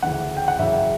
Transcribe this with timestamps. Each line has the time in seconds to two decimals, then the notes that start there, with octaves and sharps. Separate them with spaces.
0.03 D2 C#3 E3 F#5
0.37 G5
0.48 F#5
0.59 F#2 C#3 E3 E5